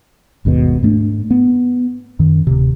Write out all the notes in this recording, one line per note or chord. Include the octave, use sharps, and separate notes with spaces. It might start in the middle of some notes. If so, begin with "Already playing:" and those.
G1 D#2 G#2 B2
G#2 A3 D4
B3
F#2 D#3
D1 C3